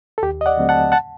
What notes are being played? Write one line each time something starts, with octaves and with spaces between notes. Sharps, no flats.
A4
D#2 G4
D#5
D5 F#5
D3 F#3 A3 C4
F#5 A5
F#5 A5